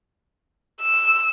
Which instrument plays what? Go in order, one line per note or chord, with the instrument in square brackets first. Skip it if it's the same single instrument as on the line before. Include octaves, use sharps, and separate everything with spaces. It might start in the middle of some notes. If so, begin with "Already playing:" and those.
[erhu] E6